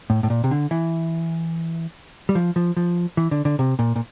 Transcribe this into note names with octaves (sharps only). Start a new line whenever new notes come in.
A2
A2
A#2
C3
D3
E3
G3
F3
F3
F3
E3
D3
D3
C3
A#2
A#2